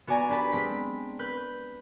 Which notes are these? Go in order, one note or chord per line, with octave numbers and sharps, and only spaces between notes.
B3 F#4 D5 G#5 A#5
D4 G4 B4 A5 B5
G#3 C4 B6
B4 F#6 G6